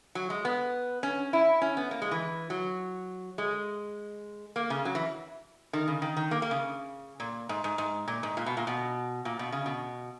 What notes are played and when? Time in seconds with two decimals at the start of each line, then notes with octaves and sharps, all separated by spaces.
0.15 F#3
0.30 G#3
0.45 B3
1.03 C#4
1.33 E4
1.62 C#4
1.77 B3
1.91 A#3
2.02 G#3
2.11 E3
2.50 F#3
3.38 G#3
4.56 A#3
4.70 C#3
4.85 F#3
4.95 E3
5.73 D#3
5.88 C#3
6.02 D#3
6.17 D#3
6.31 A#3
6.42 A#3
6.51 C#3
7.20 A#2
7.49 G#2
7.64 G#2
7.78 G#2
8.08 A#2
8.23 G#2
8.37 A#2
8.46 B2
8.57 A#2
8.67 B2
9.25 A#2
9.39 B2
9.52 C#3
9.66 B2